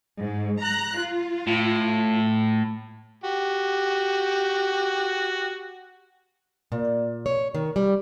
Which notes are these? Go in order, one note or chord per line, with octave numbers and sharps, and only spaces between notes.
G#2
A#5 F#6
F4
A2
F#4 G4
A#2
C#5
D#3
G3